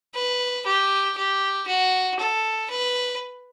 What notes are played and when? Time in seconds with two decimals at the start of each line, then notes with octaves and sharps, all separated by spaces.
0.15 B4
0.66 G4
1.18 G4
1.68 F#4
2.20 A4
2.70 B4